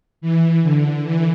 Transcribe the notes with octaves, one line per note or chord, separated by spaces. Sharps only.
E3
D3
E3